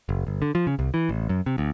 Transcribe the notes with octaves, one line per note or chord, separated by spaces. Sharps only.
F#1
G1
D3
F3
C#3
C2
E3
A1
F#2
C3
D2